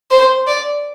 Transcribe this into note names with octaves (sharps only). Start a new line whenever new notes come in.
C5
D5